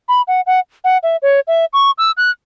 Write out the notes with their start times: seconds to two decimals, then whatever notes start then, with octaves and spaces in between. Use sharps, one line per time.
0.09 B5
0.28 F#5
0.47 F#5
0.84 F#5
1.03 E5
1.22 C#5
1.48 E5
1.73 C#6
1.98 E6
2.17 F#6